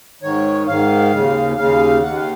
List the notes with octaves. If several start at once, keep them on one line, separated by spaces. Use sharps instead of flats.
G#2 D#3 C#5
G#2 D#3 F5
D#2 C#3
D#2 C#3 F5
D#2 D#3 F#5
F5